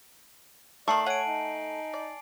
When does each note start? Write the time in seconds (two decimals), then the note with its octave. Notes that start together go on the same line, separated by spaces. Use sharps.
0.88 D#3 A3 D5 A5 C#6 C7 F#7
1.06 C#5 F#5 G#5 D7
1.28 D#4
1.94 D5